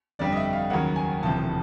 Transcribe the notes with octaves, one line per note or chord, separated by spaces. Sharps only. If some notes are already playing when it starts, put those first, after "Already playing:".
G1 F2 D3 G3 D5
D#5
E5
F5
D#2 C#3 F#3 A#3 C#4 F#5
G#5
E1 D2 C3 F3 A5